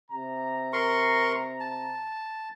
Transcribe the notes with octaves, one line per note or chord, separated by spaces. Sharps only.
C3 A#5
A#4 C6 C#6
A5